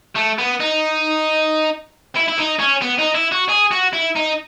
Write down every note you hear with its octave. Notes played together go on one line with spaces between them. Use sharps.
A3
B3
D#4
E4
E4
D#4
C#4
B3
D#4
E4
F#4
G#4
F#4
E4
D#4